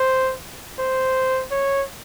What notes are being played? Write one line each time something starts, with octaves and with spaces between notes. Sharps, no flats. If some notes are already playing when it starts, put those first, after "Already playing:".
Already playing: C5
C5
C#5